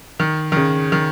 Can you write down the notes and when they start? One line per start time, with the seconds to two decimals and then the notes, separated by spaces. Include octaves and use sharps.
0.20 D#3
0.52 D#3
0.57 C#3
0.92 D#3